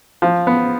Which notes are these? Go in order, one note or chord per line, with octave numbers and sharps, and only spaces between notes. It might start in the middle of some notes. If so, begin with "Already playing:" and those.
F3
B3